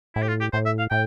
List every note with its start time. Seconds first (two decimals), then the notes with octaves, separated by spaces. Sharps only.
0.15 A2 E4
0.22 G4
0.28 F4
0.41 G4
0.53 A2 C5
0.66 E5
0.79 F5
0.91 A2 G5